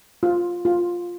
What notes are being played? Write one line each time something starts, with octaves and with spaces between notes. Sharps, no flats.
F4
F4